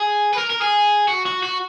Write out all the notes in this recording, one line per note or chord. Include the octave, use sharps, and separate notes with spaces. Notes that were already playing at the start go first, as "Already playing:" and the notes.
Already playing: G#4
B4
A#4
A#4
G#4
F#4
F#4
F#4